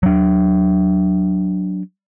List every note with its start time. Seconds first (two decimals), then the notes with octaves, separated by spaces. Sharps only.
0.03 F#3 D4